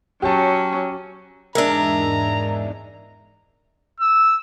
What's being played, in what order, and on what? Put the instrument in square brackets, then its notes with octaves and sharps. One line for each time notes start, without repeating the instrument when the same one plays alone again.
[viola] F#3 C#4 [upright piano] G4 A5
[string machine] E2 G#2 [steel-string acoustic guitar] G#3 D4 [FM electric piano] A#4 E5 [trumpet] A#5
[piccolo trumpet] E6